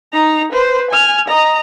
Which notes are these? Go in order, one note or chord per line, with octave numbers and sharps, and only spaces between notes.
D#4 A#5
B4 C5
G#5 F6
D#5 A#5